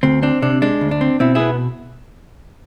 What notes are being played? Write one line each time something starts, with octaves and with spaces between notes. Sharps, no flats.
D2 C4
C4 D4
C3 D4
G#3 D4
D2
D4
C4
B2 C4 E4
B3 E4 G#4